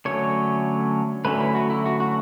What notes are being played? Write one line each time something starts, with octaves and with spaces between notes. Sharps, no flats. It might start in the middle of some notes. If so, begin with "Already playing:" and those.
D3 F#3 A3 C#4 C#5
D3 F#3 A3 C#4 B4
E4
F#4
E4
F#4
F#4